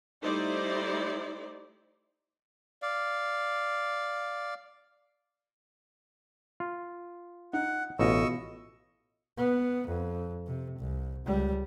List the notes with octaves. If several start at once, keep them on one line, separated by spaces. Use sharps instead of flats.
G3 A3 D#4 E4 C5 D5
D5 F5
F4
D#4 F#5
A1 B2 F4 D#5 C#6 E6
B3
F2
C3
C2
C#2 G3